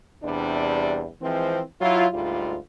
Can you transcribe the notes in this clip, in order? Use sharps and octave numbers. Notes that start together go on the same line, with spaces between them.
E2 C3 G3 D4
E3 F3 G#3 C4
F#3 E4 F4
D2 G#2 G3 F4